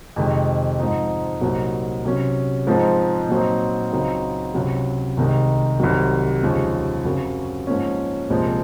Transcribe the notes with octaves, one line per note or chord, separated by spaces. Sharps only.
F2 C3 D#3 G#3
G#2 F3 C4 D#4
C2 A#2 F#3 C4 D#4
C3 F#3 C#4
G#2 F3 G#3 C4 D#4
A#2 F#3 C4 D#4
C#2 C#3 F#3 C4 D#4
C#2 C3 F#3 C#4
C2 C3 D#3 G#3 D#4
C2 C3 D#3 F#3
D#2 C#3 F3 G#3
F#2 C#3 F#3 C4
G#2 F3 A#3 C#4
C2 A#2 F3 G#3 C4